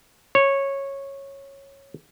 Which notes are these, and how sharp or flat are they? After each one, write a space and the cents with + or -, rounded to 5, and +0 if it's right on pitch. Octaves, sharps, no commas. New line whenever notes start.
C#5 -10